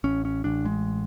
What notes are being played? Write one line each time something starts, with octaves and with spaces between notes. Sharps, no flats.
A1 C#4
C#4
A1 D4
G#3